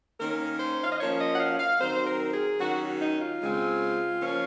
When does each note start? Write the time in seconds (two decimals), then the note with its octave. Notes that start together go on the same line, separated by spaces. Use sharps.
0.19 D#3 A#3 C#4 A#4
0.59 C5
0.83 F5
0.91 D#5
1.00 F3 A#3 C#4 C#5
1.19 D#5
1.33 F#5
1.40 F5
1.59 F5
1.79 D#3 F#3 C4 C5
2.06 A#4
2.33 G#4
2.59 D#3 F#3 C#4 F#4
3.00 D#4
3.20 F4
3.40 C#3 G#3 C4
4.20 F3 A#3 C#4